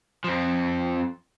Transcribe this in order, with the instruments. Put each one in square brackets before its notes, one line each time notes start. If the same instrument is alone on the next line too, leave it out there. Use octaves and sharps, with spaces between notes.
[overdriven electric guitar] F2 F3